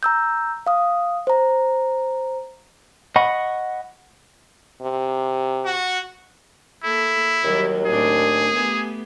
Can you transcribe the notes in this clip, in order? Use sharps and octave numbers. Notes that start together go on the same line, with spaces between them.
A#5 E6 G6
F5 D#6
C5 A#5
D#5 F#5 B5 C#6
C3
F#4
A#3 E4 A4
D#2 D#3 F#3 G3
A2 C4 D4 G#4
A3 B3 G4